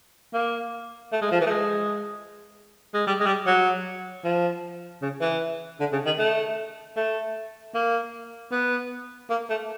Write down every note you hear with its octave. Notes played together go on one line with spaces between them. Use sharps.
A#3
A3
G#3
F3
E3
A3
G#3
G#3
G3
G#3
G3
F#3
F3
C#3
E3
D3
C#3
D#3
A3
A3
A#3
B3
A#3
A3